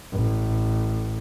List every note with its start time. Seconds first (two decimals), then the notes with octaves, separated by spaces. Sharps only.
0.12 A1